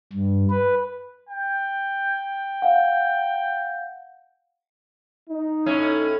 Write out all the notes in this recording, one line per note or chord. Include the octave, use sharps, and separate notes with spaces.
G2
B4
G5
F5 F#5
D#4
A2 C#4